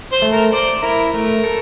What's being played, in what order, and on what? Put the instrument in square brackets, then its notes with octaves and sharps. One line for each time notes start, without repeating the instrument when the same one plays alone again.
[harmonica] C5
[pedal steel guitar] A3
[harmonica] A#4
[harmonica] C5 [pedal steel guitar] D5
[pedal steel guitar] E4 [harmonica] A#4
[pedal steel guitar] A3 [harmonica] A#4
[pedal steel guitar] A4